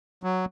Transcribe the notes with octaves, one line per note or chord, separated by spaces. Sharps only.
F#3